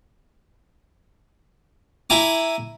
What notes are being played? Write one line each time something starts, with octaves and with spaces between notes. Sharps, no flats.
E4 G#5 A#5 D6